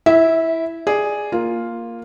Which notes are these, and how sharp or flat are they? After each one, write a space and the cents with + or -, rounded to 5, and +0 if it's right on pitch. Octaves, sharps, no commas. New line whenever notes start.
E4 +0 E5 -20
G#4 +0 D5 +10
A#3 +0 F4 +0